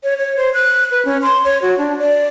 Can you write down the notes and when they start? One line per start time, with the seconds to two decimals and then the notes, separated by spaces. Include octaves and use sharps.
0.03 C#5
0.17 C#5
0.37 C5
0.54 F#6
0.91 B4
1.05 C#4
1.22 C6
1.44 C#5
1.62 F#4
1.78 D4
1.99 D5